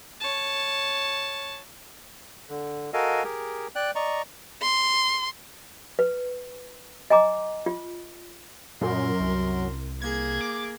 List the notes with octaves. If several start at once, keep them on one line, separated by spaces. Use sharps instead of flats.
C#5 A5
D3
F#4 A4 A#4 D#5 F5 G#5
G4 G#4 A#4
D5 G5 F#6
D5 D#5 A#5 C#6
C6
B4
D#5 G#5 A#5 D6
F4
F#2 A#2 A#4 C6
C2
A#3 G#4 G#6
D6